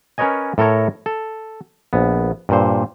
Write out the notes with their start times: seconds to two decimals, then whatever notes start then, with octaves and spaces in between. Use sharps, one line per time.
0.18 C#4 A#4 B4 C#5 D#5 G#5
0.58 A2 A4 A#4 C#5 A#5
1.06 A4
1.93 A#1 B3
2.49 G2 A#2 C5